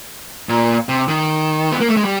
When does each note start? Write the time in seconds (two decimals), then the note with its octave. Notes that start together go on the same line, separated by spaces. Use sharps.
0.49 A#2
0.89 C3
1.08 D#3
1.72 B3
1.80 A#3
1.88 A3
1.97 G#3
2.05 G3